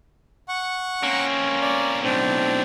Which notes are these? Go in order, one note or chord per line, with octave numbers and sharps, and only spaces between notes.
F#5 C#6
A#3 C4 C#4
D5
B1 A2 C4 D4